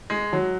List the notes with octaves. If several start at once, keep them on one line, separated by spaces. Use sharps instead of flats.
G#3
F#3